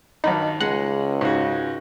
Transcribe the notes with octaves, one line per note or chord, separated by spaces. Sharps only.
G2 D#3 F#3 D#4 B5
C#2 G#3 F#5
G#2 C#3 F#4